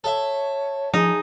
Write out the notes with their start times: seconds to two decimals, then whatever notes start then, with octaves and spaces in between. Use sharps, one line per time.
0.04 A4 C#5 E5
0.94 F3 D#4 G#4